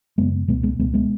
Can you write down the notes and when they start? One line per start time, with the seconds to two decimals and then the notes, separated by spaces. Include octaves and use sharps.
0.18 F#2 C#3 G#3 B3
0.48 C#2 B2 G#3 B3
0.63 G#3 B3
0.79 C#2 G#3 B3
0.82 B2
0.94 G#3 B3